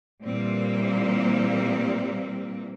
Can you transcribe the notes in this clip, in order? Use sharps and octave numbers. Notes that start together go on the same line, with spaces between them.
A#2 E3 G3 A#3 C4